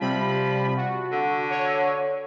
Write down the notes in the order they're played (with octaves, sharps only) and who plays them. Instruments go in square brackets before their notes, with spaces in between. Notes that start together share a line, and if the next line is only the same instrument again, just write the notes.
[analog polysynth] C3 G3 B5 [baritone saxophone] F3
[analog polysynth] F#4
[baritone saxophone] D3
[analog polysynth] C#5